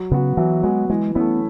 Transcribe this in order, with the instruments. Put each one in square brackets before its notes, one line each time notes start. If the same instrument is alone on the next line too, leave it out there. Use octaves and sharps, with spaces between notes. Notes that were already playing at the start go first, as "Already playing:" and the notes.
Already playing: [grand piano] F#3
[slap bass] C#3 [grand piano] B3 F#4
[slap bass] E3 [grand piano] F#3
[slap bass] G#3 [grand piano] B3 F#4
[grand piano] E3 [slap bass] G#3
[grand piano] A3 C#4 E4 [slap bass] B3